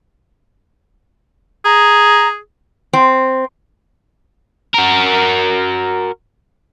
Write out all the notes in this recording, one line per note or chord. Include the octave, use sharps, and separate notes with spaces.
G#4 A#5
C4
F#4 A#4